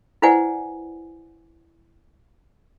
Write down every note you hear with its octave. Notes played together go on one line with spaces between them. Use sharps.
E4 B4 C5 D5 F#5 G#5